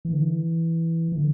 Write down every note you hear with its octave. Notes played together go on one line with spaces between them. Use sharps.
E3
D3
E3
E3
D3